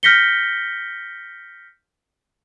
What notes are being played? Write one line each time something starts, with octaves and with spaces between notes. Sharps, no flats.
F6 G6 A#6 B6 C#7 G7